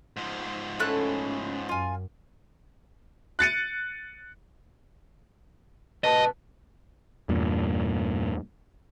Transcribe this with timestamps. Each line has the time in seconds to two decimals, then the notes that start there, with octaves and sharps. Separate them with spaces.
0.17 G#2 F3
0.79 A3 C#4 E4 F#6
1.69 F#2 F4 G#5
3.39 F#6 A6 C#7 D#7
6.04 C2 B4 D#5 A5
7.29 E2 G2 A#2